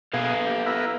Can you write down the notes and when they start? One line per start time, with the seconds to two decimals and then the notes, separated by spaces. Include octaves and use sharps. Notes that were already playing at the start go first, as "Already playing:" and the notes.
0.13 B2 G#4 A4 B4 F5
0.47 G4
0.66 B3 E4 A#4